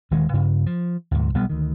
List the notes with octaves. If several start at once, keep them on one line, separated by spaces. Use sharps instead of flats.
D#1 D2 D#3 G#3
G2 C#3
F3
D2 G#2
B1 G3 B3
D2 D#3